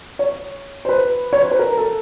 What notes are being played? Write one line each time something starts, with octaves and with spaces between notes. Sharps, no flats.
C#5
C5
B4
C#5
C5
B4
A#4
A4